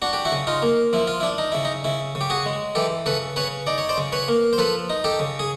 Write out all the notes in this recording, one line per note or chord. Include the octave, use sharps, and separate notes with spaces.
D4 F#4
G4
E4 F#4
C#3
D#4 F4
A#3
F3 E4
F4
D4 E4
D#4
C#3 E4
D#4
C#3 E4
C#3
G4
F#4 G#4
G#3
E3 G4 A4
C#3 A4 B4
C#3 B4 C#5
D#4 D5
C#5
C5 D5
C#3
B4 C#5
A#3
C5
F3 A4 B4
D#4
G4 A4
C#3
G#4